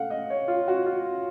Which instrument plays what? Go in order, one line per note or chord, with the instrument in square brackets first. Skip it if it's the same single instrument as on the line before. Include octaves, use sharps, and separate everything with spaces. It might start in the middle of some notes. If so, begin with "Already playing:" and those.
Already playing: [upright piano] A3 F5 F#5
D#5
C#5
F4
F#4
F4